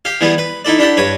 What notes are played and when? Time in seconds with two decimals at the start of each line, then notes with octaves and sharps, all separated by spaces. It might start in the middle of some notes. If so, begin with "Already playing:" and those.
0.05 G4 F5
0.21 E3 G3 B3 G#4
0.38 B4
0.65 D#4 E4 A4 D5
0.79 D4 E4 G4 A4 F#5
0.97 G2 B4 C#5